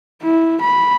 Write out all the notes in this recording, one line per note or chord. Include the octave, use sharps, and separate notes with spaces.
E4
B5